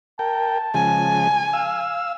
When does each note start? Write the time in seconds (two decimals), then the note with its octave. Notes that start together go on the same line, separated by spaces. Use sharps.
0.19 A#4 G5 A5
0.74 C#3 F3 G#3 G#5
1.53 F5 E6